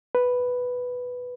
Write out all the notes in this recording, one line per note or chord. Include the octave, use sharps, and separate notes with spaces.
B4